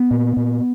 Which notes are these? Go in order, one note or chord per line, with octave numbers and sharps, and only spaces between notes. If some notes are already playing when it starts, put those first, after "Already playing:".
Already playing: B3
A#2
A#2